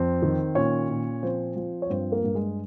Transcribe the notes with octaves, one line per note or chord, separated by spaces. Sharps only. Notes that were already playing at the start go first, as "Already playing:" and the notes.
Already playing: F2 C4 C5
D#3
A#2 C#4 C#5
A#2
F3 C4 C5
F3
C#5
G2 C4 C5
A#3 A#4
G2
G#3 G#4